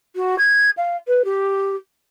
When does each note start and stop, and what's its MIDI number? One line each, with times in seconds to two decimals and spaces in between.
0.16 0.36 66
0.39 0.70 92
0.77 0.97 77
1.08 1.22 71
1.25 1.76 67